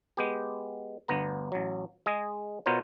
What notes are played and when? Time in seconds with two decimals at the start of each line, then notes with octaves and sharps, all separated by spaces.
0.17 G#3 B3 G4
1.08 G1 D2 B3 A#5
1.52 A1 F#3
2.06 G#3 G#4 D#5 G#5
2.66 B2 B3 F4 A#4 C5 C#5